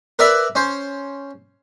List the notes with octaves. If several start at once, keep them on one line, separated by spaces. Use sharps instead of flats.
A#4 B4 D5 E5
C#4 C5